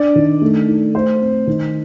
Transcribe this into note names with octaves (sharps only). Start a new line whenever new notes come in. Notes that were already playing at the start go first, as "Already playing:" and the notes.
Already playing: D4 D5
D#3
A3
D#4
A3 C5
C4
D#3